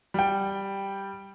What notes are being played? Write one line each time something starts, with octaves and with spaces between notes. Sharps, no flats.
G3 G5